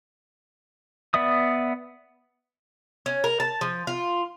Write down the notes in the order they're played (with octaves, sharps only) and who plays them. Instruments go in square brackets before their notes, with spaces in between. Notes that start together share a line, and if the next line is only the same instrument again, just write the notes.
[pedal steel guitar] B3 D5 E5 D#6
[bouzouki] C#4
A#4
A5
F3
F4